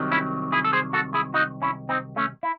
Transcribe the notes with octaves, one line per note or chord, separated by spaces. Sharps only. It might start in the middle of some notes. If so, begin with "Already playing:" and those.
Already playing: C2 C3 D#3 F#3
C#4 E4
E4 G#4
A4
G#4 C5
F#4 A4
E4 G#4
D#4 F#4
C#4 E4
C4 D#4
A3 C#4
E4